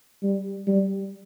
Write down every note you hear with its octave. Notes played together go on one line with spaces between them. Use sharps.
G3
G3